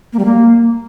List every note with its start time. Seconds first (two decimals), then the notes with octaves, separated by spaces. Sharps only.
0.13 A#3
0.19 G3
0.25 A#3